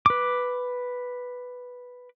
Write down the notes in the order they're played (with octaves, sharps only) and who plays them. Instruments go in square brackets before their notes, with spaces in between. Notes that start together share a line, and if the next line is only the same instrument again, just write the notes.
[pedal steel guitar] B4 D6